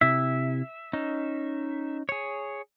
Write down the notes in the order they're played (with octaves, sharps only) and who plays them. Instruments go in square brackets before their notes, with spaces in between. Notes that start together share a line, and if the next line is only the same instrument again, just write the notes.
[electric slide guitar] C3 E4 [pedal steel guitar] E5
[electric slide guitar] C#4 D#4
G#4 C#5